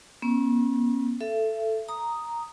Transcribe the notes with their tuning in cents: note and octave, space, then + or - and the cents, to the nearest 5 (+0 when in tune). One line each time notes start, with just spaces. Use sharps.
A#3 +45 C#4 -35
A4 +0 E5 +30
A#5 +0 D#6 +0